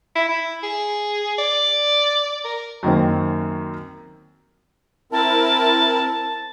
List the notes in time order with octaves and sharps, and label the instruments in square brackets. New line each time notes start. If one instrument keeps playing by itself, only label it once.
[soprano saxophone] E4
E4
G#4
D5
A#4
[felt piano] F#2 D#3 A#3 C4
[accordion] C4 E4 A#4 [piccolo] A5